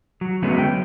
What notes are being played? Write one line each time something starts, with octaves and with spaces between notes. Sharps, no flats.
F#3
D3 F#3 G#3 A3 B3 C#4
G5